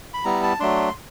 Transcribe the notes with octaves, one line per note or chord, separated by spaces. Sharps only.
B5
G3 B3 E4 A#5
A5
F#3 A3 D4 C6